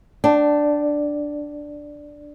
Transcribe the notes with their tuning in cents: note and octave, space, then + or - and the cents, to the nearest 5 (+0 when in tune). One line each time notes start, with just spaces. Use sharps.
D4 +0 G5 -30